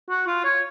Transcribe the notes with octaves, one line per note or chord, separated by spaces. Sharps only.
F#4
F4
C#5